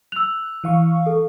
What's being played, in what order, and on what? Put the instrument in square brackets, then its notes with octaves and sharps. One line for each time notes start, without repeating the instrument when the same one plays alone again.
[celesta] E6 F7 [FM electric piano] F#6
[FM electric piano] E3 F5 C#6
[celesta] A4